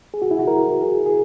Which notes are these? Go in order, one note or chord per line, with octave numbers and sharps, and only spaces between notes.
G#4
F#4
E4
F#4
A#4
G#4
G#4